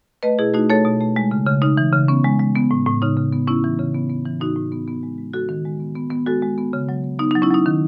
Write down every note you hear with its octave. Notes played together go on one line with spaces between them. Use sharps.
A3 B4 D#5
B2 E4 G#4
A3 D#4 F#4
A3 A4 C#5
B2
A3
G#3
C#3
C#3
C#3 D#4
E3
C#3
B3 C#4
G#3
G#3
B3
A2
A2
C#3 D#4
C#3
B3
B3 C#4 E4
E3
C#3
B3
B3
E3
A2 D#4 F#4
A2
B3
B3
G#3
G#3
G#3 F#4 A4
D#3
G#3
B3
B3
B3
G#3 F#4 A4
G#3
B3
C#3
F#3
B3
B3 D#4
D#4
F#3
C#4 E4
F#3 D#4
D#3